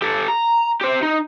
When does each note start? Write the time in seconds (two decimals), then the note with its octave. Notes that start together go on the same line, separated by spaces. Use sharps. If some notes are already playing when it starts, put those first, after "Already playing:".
0.02 G4 A4
0.28 A#5
0.81 G4 C5
1.03 D#4